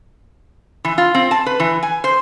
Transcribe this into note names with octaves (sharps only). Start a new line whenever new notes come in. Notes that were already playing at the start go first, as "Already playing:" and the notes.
E3
F4
C4
A5
B4
E3
G#5
C5